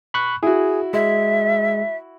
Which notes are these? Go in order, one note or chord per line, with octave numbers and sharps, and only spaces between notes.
B5 C#6 F#6
E4 F#4 G#4
G#3 E5